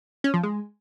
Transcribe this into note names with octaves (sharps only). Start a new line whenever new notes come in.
C#4
F3
G#3